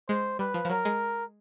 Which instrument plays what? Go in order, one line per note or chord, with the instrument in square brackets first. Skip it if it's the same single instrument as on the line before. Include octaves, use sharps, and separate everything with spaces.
[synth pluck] G#3 [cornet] C5
[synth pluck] G3 [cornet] B4
[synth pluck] F3
F3
[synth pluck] F#3 [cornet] A#4
[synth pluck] G#3